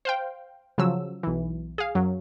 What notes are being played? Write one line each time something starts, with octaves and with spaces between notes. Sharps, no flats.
C5 F5 G5
C#3 F3 F#3 E6
B1 E3
G#4 F5
F#2 F#3